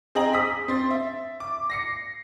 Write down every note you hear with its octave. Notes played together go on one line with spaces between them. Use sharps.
C4 G#4 D#5 G5 A#5 F#7
D#6 B6
C4 C6 A6
E5
D6
A#6 C7 C#7